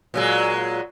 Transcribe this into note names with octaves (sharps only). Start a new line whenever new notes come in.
A#2 F#3 G#3